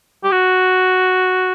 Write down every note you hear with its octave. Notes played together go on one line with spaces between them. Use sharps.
G4
F#4